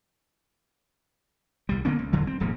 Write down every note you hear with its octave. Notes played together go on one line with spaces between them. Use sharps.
C2 G3
D3 A#3 B3 C#4
C#2
G1 E2 D3 F#3
C4
D#1 G#2 F3 A#3